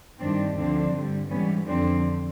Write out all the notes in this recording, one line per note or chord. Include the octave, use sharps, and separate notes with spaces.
G2 D#3 G3 C4 D4
D2 D3 F3 C4 D4
G2 D3 G3
G#2 E3 G3 B3 C#4
F2 D3 F3 C4 D4